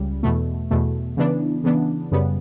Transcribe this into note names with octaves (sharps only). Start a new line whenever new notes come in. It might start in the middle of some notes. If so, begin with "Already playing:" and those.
Already playing: C#2 C#3 G3
E2 B2 A3
E2 B2 A3
C#3 E3 B3 D4
C#3 E3 B3 D4
F#2 C#3 G3 B3